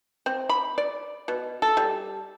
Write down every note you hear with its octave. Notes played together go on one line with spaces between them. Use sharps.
C4
B5
D5
B2
A4
G3